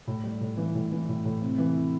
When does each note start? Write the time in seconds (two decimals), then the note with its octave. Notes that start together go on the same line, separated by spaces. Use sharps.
0.07 A2
0.24 G3
0.41 A2
0.57 E3
0.74 A2
0.91 E3
1.09 A2
1.25 A2
1.41 C3
1.58 E3